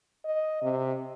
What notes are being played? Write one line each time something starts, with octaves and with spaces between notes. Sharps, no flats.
D#5
C3